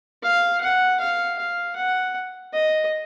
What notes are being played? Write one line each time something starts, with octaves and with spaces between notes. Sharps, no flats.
F5
F#5
F5
F5
F#5
D#5